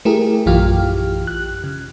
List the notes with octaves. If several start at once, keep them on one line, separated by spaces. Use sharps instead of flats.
A3 E4 G4 G#4 A#4
A#1 F#2 E3 F4 G4 F6
F#6
C#3